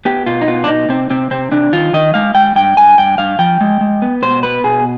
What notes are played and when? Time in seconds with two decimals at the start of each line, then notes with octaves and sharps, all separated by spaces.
0.05 B3 G4
0.26 B2 F4
0.41 D#4
0.47 B3 F4
0.64 D4
0.68 B2 D#4
0.89 C3 C4
1.10 C3 C4
1.31 C3 C4
1.52 C3 D4
1.73 D#3 F4
1.93 D#3 D#5
2.14 G#3 F5
2.35 G#3 G5
2.56 G2 G5
2.77 G2 G#5
2.98 G2 G5
3.18 G2 F5
3.39 F3 G5
3.61 G#3
3.81 G#3
4.02 B3
4.23 B2 C5
4.43 B3 B4
4.64 B2 G#4